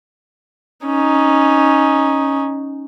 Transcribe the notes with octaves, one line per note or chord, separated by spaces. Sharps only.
C#4 D#4